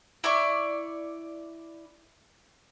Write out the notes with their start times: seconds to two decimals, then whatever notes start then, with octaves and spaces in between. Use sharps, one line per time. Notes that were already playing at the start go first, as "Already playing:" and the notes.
0.24 E4 D5 C#6